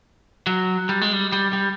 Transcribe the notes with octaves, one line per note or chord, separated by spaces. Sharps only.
F#3
G3
G#3
G3
G3
G3